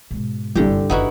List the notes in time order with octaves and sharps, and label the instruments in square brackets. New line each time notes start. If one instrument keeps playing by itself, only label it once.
[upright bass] G#2 B2
[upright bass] F#1 [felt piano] C2 G2 [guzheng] D3 G4
[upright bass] F#1 D#3 [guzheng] D#4 E4 F#4 [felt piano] B4 D#5 F#5